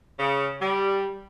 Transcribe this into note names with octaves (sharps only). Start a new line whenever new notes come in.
C#3
G3